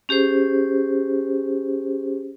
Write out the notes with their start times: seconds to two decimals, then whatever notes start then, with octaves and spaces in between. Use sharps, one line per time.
0.09 C#4 G4 G#4 C5